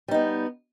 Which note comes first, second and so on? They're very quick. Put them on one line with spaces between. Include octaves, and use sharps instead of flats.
G3 D#4 B3